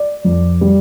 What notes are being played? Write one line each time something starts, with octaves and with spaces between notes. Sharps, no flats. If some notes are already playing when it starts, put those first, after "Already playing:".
Already playing: D5
F2
G3